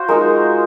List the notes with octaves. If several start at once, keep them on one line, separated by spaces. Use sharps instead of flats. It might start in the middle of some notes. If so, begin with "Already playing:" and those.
Already playing: F4 F#4 C5
G#3 D#4 A#4